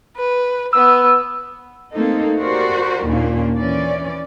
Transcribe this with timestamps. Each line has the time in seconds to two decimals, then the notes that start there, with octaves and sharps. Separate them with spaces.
0.17 B4
0.73 B3 B4 E6
1.92 A3 A#3 C4 D#4 A4
2.38 F#4 G4 A#4 C5 D5
3.06 D#2 A#2 A#3 C#4 D4
3.57 E3 C#4 D5